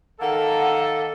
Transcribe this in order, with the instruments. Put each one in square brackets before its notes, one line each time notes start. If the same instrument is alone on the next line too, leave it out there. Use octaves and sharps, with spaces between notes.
[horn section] D#3 A#3 A4 [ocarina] F#5